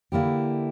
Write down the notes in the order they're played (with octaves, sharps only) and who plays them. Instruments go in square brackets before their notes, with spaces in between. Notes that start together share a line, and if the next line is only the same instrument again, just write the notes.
[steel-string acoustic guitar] D3 A#3 E4 G4